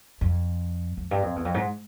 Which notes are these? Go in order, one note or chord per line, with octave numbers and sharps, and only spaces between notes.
F2
F2
G2
F2
E2
F2
G#2